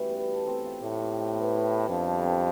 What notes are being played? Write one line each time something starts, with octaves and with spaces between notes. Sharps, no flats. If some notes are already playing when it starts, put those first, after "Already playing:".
Already playing: E3 G3 A3 C#4 F#4
B3
A4
C4
F4
A2 G4
C4
D#4
B3
E4
G#4
F2 D3
G3
C4